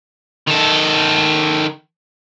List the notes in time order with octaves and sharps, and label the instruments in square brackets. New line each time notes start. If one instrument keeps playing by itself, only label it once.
[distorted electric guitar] D#3 A4